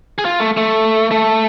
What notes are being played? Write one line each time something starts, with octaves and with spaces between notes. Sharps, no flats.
G#4
F4
A3
A3
A3